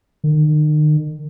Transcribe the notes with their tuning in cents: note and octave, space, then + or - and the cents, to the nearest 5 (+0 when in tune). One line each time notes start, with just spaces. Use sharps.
D#3 -40